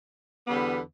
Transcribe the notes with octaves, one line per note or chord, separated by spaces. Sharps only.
E2 D3 G3 B3